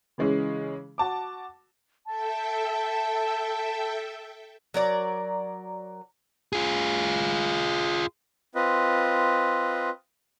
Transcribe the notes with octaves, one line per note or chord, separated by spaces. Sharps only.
C#3 E3 G#3 C#4 G#4
F#4 A5 D6
A4 E5 G5 A5
F#3 A#4 D5
F4 G#4
C4 F4 B4 D#5